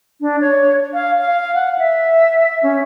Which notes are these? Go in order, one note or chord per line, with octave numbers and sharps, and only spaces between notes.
D4
C#5
F5
F5
F#5
E5
C#4